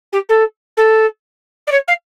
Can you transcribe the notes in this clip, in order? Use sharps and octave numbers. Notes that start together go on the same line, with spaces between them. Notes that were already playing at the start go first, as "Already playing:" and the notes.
G4
A4
A4
D5
C#5
F5